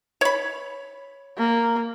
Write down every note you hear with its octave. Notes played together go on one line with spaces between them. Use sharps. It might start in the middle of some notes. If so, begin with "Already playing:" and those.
C#5 B5
A#3